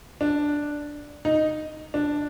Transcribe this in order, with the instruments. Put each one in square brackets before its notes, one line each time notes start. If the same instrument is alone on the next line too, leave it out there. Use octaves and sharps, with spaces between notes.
[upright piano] D4
D#4
D4